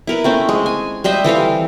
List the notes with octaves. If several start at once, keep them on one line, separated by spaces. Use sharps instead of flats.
E4 A#4 B4
A3 C4 C#4
G#3
G#5
G3 C5 D#5 E5
E3 C4 A4 F5